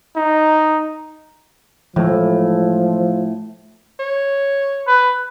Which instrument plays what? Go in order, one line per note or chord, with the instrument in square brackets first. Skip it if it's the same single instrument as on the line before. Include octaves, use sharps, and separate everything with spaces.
[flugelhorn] D#4
[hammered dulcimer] A2 [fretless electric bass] E3 G#3 [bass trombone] F3
[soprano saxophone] C#5
[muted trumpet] B4